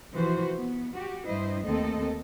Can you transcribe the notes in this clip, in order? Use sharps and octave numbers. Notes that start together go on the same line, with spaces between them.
C3 E3 F3 F#4 C5
B3
F#4 G4
G2 E4 C5 D#5
D#2 A3 C4 A4 D#5